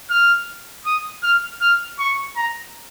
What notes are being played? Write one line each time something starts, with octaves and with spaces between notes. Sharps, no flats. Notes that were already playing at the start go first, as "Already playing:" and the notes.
F6
D#6
F6
F6
C#6
A#5